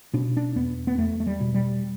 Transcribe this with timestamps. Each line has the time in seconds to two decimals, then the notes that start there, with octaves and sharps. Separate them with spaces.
0.14 B2 D4
0.37 D4
0.56 E2 B3
0.87 B3
0.98 E2 A3
1.20 A3
1.27 G3
1.41 B2
1.54 G3